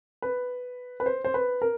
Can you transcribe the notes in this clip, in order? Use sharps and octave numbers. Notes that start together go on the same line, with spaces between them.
B4
B4
C5
C5
B4
A#4